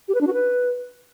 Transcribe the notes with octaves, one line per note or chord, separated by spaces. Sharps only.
G4
B4
D4
F#4
B4